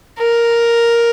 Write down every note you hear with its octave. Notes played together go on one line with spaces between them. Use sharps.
A#4